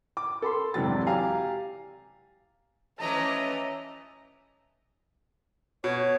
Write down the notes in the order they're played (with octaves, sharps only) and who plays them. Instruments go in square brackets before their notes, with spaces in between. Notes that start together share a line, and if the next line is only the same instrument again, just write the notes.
[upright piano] D6
A4 B5 C6
F1 G#2 C3 E3 F#3 A6
G4 F5 G#5 A#5
[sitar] E3 F3 A3 [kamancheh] C#4 [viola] D#5 E5 [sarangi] A#5
[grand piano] B2 [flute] C#5